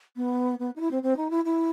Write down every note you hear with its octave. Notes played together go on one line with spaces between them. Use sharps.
B3
B3
D#4
E4
C4
C4
D#4
E4
E4